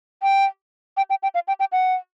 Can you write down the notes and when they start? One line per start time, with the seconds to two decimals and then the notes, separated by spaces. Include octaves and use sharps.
0.23 G5
0.97 G5
1.10 G5
1.23 G5
1.34 F5
1.48 G5
1.60 G5
1.72 F#5